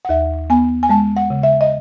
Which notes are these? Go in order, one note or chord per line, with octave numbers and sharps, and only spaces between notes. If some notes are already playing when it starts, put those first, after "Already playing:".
F#5
D#2 E5
B3 G#5
G#5
G#3 A5
F#5
C#3
E5
D#5